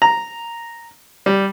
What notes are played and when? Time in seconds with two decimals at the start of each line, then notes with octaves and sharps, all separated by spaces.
0.02 A#5
1.26 G3